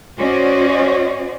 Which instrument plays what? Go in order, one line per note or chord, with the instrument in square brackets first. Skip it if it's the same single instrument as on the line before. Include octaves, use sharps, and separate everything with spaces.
[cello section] C#4 F#4 C5 D5 D#5